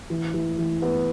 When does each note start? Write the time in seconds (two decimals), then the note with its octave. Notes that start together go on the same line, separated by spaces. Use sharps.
0.10 E3
0.34 E3
0.58 E3
0.82 B3